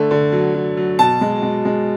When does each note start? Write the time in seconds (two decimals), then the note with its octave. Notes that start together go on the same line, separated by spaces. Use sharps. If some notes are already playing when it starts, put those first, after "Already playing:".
Already playing: D3 A3
0.11 D3
0.32 F#3
0.54 F#3
0.77 F#3
0.99 B2 A5
1.21 G#3
1.42 G#3
1.65 G#3